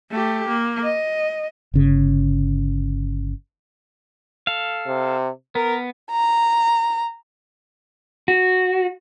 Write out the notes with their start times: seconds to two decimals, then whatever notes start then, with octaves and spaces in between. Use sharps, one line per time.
0.11 A3 G4
0.48 A#3
0.83 D#5
1.74 G1 C#3
4.47 A4 F5
4.87 C3
5.55 B3 A#4
6.11 A#5
8.28 F#4